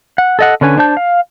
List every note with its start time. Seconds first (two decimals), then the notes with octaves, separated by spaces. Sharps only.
0.18 F#5
0.39 A4 D#5 F#5
0.61 D3 C#4 B4 G#5
0.78 D4 C5 A5 G6
0.97 F5